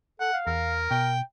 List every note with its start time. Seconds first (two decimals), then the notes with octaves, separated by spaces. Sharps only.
0.20 A4 F#5
0.33 F5
0.47 E2 A#4
0.91 B2 G5